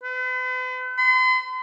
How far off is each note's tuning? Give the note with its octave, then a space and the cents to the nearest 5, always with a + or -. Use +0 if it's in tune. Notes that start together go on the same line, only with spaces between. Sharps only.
B4 +45
C6 -45